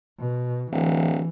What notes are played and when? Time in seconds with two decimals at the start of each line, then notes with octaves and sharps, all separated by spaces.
0.19 B2
0.72 D1 E3